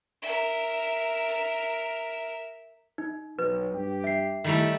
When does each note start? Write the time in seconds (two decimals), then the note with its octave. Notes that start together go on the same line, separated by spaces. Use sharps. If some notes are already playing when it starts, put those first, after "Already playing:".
0.22 A#4 E5
2.98 D#4
3.39 B1 B4
3.72 G2 G4
4.04 E5 C7
4.44 D#3 G3 A3 E4 G4 A4